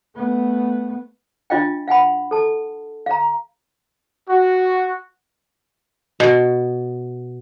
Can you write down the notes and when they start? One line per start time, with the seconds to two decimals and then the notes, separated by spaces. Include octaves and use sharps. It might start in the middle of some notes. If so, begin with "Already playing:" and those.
0.16 A3 B3
1.50 D4 F4 D#5 F5 G5
1.88 F5 F#5 G#5 B5
2.31 A4 A5
3.06 F5 A#5
4.29 F#4
6.20 B2